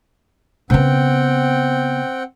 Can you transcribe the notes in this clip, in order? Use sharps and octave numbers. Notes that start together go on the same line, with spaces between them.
C#3 B3 C4 F#5 G5